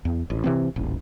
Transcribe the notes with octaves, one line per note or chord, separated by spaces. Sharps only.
E2
A1
C3 E3 C4
D#1 A1